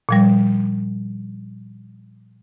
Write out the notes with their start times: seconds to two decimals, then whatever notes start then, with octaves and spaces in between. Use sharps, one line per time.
0.09 A#2 F3 G3